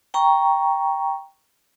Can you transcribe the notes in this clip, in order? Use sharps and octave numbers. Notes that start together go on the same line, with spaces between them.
G5 A#5 C#6